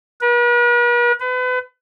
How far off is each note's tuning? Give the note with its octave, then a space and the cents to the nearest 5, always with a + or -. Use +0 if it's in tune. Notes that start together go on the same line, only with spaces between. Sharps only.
B4 -45
B4 +35